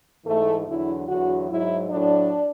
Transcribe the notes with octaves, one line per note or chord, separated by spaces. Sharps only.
G#2 E3 A3
E2 D3 F#3 E4
E2 D3 F#3 F#4
G#2 F#3 E4
A2 F#3 D4